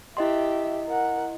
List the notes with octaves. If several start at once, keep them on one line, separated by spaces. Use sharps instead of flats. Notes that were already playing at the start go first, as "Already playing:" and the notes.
E4 G4 D#5 E5 C6
A#4 F#5